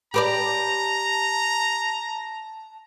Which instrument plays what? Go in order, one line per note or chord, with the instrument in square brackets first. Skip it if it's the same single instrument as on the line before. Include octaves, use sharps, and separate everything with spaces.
[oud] G4 B4 D5 [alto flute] A5 [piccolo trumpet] A#5